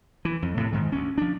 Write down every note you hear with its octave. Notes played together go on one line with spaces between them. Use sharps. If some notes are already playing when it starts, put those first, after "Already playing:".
E3
F2
A2 C3
G#2 D#3
D2 C#4
F3 D4